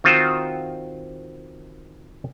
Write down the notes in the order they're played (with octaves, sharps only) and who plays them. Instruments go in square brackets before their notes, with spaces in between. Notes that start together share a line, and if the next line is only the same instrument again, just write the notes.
[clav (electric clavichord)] D#3 C4 F4 F#4 C5